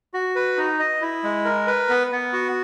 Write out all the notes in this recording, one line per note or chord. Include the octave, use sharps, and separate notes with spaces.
F#4
B4
D#4
D#5
E4
G#3
A#4
B4
B3
B3
F#4